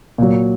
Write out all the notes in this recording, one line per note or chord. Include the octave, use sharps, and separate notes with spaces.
A#2 F#3